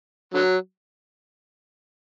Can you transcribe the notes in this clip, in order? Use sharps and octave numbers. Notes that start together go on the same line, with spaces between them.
D3 F#3